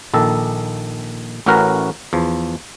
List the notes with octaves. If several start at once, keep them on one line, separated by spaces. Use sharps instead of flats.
A#1 D#3 A4
A1 A2 C#4 F#4 A#4 B4
E2 F3